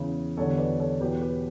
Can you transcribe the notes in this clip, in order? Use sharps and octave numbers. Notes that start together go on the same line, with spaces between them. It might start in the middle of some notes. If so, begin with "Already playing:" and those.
Already playing: E2 C#3 E3
E2 D3 G3 A4 C#5
B4 D5
A4 C#5
E2 B2 F#3 G4 B4
G4 B4